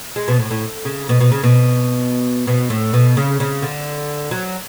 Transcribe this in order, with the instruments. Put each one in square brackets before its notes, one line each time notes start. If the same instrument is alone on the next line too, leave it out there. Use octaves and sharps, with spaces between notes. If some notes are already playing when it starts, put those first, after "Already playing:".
[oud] G#3
B2
A2
A2
C#3
B2
B2
C#3
B2
B2
A2
B2
C#3
C#3
D3
F#3